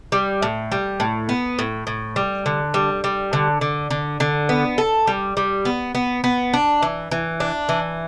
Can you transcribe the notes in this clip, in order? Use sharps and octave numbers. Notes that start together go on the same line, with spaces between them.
G3
A2
G3
A2
B3
A2
A2
G3
D3
G3
G3
D3
D3
D3
D3
B3
A4
G3
G3
B3
B3
B3
D4
E3
E3
D4
E3